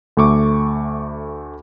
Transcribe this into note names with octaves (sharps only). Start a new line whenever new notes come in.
D2 A3 C#6 D6